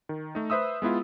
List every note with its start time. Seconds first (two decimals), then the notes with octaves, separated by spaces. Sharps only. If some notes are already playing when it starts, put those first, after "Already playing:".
0.09 D#3
0.35 A3 D#4
0.50 B4 C5 E5 D#6 E6
0.82 G#3 B3 E4 F4